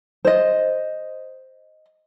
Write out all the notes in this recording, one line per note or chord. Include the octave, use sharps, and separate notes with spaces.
C5 D#5